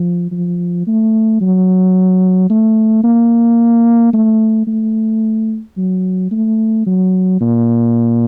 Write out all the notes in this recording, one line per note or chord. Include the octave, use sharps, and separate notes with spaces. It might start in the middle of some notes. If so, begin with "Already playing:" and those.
Already playing: F3
F3
A3
F#3
A3
A#3
A3
A3
F#3
A3
F#3
A#2